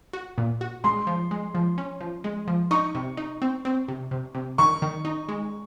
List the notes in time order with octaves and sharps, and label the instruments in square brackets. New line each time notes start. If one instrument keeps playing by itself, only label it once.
[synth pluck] F#4
A#2
F#4
[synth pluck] G#3 [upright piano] C6
[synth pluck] F3
G#3
F3
C#4
F3
G#3
F3
[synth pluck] D#4 [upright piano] C#6
[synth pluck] C3
D#4
C4
C4
C3
C3
C3
[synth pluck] D#3 [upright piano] C#6
[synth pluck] D#3
D#4
G#3